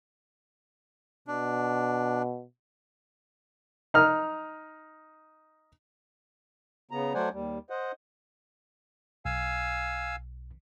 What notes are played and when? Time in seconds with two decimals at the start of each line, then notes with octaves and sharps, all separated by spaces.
1.28 B2 D4
3.94 D#4 F6
6.91 C#3 B3 A#5
7.14 F#3 A3 C5 D5 F#5 G#5
7.33 D#2 G3
7.70 C5 D#5 F#5
9.25 B1 F5 G#5 E6